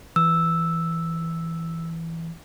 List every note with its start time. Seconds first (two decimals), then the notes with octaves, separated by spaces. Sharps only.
0.16 E3 E6